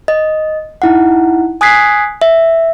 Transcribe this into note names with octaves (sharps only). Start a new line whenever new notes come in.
D#5
D#4 E4 F#5
G#5 D#6 F#6 G#6 B6 C7
E5